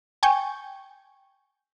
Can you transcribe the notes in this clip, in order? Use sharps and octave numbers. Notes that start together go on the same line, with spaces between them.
G5 G#5 C#6 G6